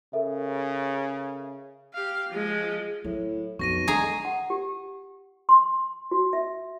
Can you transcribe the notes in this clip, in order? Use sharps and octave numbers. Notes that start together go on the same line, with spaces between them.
C#3 A4 A#4 E5
G4 F5
F3 G#3
A2 F#3
B1 F2 C#6 A#6 D#7
D3 G#3 G#4 A#5
F#5
G4
C6
F#4
E5